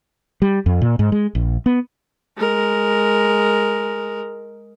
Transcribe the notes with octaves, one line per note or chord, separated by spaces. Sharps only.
G3
F2
A#2
G#2
G#3
A#1
B3
G#3 A#4